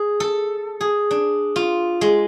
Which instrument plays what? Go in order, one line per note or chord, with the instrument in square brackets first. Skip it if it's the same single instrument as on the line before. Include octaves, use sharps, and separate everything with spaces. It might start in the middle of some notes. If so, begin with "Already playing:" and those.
Already playing: [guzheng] G#4
A4
G#4
D4
F4
G#3